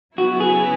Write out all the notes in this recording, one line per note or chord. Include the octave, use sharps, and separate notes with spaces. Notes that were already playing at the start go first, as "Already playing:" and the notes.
C#3 F#3 B3 E4 F#4
G#4